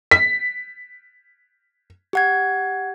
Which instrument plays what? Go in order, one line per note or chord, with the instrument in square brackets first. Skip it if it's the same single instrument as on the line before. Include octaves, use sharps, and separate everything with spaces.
[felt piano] B6
[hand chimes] G4 F#5 G#6